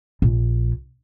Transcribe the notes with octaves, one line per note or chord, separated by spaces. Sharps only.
A#1